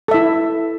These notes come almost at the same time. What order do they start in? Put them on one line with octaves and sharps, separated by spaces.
A4 E5 E4